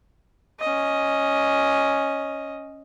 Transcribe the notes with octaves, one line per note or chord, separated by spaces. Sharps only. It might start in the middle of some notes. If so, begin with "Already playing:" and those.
C#4 D#5